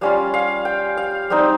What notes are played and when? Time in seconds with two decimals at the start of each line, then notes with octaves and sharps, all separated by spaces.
0.01 G3 C#4 F4 F5
0.34 F5
0.65 G5
0.97 F5
1.30 G3 C4 D#4